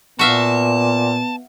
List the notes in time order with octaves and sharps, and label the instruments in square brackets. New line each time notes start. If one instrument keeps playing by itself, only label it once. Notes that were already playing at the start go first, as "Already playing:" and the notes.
[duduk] A#2 [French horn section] B3 [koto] F#4 E5 F5 [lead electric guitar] A5